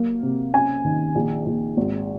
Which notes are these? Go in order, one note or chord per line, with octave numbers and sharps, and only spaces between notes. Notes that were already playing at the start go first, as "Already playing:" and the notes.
Already playing: F#3 A#3
C3
C#4 G#5
D#3
A#1
A#1
G#1